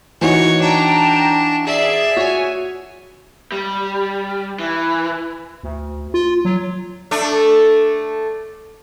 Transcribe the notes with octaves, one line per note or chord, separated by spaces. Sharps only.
E3 D#4 F#4 C#5
D4 G5 A5 A#5
G#4 D5 E5 C7
F#4 C#5 G#5
G3
E3
D2
F4
F#3
A3 D4